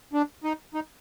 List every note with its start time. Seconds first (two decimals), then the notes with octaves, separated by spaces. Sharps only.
0.13 D4
0.44 D#4
0.74 D#4